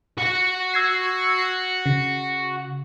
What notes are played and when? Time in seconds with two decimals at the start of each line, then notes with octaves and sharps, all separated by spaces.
0.18 F#4 F#5
0.74 E6 G#6 C7
1.86 C#3